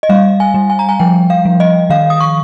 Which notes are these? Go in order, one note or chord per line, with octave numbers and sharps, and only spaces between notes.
D#5
G3 F5
G#5
G3
G#5
A#5
G#5
F3 G5
F5
F3
D#5
D#3 F5
D#6
C#6